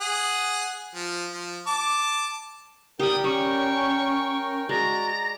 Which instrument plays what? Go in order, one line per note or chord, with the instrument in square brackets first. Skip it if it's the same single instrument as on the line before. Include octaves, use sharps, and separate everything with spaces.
[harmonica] G#4 F#5 D#6
F3
F3
A5 D6
[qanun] G3 G4 [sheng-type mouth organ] A#4 G5 [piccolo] D#6
[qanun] G3 [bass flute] C#4 [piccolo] C#6
[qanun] G#3 [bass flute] F#4 [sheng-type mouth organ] D5 [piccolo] A#5